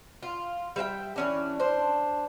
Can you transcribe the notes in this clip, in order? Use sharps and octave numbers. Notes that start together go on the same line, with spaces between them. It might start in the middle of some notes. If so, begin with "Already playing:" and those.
F4
G3 E5 F5 G5
E3 C#4 D4
D4 C5